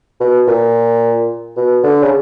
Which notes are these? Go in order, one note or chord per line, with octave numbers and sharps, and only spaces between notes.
B2
A#2
B2
D3
C#3